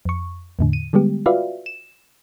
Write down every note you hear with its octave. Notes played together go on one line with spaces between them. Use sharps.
F2 C#6
E2 A2 D3
D#7
D3 G3 G#3 B3 G4
F4 F#4 B4 D5 E5 F5
E7